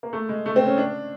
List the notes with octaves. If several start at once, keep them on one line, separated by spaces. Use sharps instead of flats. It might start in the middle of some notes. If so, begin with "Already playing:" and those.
A#3
A3
G#3
A3
C4
C#4
D4